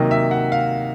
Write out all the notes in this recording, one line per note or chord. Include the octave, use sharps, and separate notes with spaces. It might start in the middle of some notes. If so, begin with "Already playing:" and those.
Already playing: C3 D#3 F#3 A#3 D#5
E5
F#5
F5